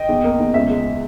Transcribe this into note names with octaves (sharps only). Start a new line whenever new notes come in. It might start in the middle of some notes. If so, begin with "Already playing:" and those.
Already playing: D#5 G5
E2
A#3
E2
C#2 E5
G#3